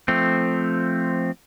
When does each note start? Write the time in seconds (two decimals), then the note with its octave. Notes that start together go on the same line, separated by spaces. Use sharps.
0.08 F3 A3 C4